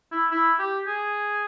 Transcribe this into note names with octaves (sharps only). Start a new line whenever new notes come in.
E4
E4
G4
G#4